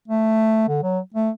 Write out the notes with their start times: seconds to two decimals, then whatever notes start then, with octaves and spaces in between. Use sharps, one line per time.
0.08 A3
0.69 D3
0.83 F#3
1.14 A3